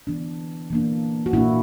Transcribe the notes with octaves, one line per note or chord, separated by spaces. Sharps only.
E3 B3 D4
E3 A#3 D4
F#4
A#2 A#3 D4 E4